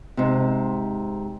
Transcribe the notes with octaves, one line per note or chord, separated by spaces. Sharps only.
G#2 C3